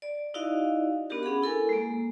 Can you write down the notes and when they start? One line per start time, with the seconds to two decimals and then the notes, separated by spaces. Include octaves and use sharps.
0.02 D5
0.34 D#4 E4 F#4 D5 D#5 F5
1.10 B3 D4 F#4 G4 A#4
1.23 C#4 G#4 F#5 B5
1.42 E4 A4 A#4 G#5
1.69 G#3 A#3